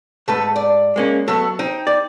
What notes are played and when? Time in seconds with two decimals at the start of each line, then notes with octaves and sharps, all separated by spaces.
0.28 G#2 A3 A4 B4
0.56 D5
0.96 G#3 A#3 C#4
1.28 F#3 A3 B3 A4
1.59 D#4 C5 G5
1.87 D5